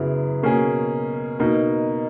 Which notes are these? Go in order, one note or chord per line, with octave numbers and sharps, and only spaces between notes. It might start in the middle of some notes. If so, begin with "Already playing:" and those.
Already playing: F#2 C#3 F#3 B3 E4
B2 A#3 C#4 G#4
B2 A#3 D#4